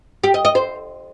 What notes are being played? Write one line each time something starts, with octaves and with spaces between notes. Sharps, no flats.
G4
D#5
D#5
C5